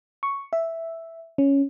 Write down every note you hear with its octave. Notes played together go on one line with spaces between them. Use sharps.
C#6
E5
C#4